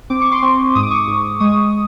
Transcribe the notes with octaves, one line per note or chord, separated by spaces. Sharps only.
C4 D6
C#6
C6 D6
C4
G#2 D#6
D6
C#6 D#6
G#2
G#3 C#6 D#6